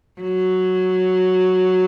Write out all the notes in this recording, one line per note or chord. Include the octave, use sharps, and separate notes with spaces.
F#3